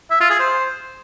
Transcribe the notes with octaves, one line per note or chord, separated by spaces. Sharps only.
E5
F4
G#4
C5